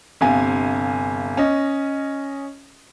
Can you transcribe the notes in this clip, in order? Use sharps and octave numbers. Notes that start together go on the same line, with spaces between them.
G1 C3 F5 G#5
C#4 D#5